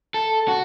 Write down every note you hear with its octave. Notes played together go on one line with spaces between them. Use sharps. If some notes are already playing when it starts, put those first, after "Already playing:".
A4
F#4